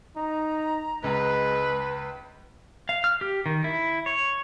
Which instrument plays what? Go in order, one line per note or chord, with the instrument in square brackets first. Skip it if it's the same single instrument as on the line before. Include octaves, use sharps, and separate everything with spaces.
[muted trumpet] D#4 [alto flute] A#5
[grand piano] C#2 [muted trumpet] G#3 [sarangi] B4
[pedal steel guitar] F5
F6
G4
D#3
E4
C#5